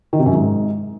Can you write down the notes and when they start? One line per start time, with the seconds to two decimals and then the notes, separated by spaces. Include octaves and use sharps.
0.13 D#3
0.19 C3
0.26 F#2
0.32 G#2